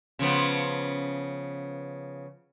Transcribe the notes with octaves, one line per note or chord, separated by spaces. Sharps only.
C#3 F3 B3